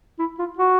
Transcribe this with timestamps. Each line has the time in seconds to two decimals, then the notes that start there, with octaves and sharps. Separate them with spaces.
0.19 E4
0.39 F4
0.58 F#4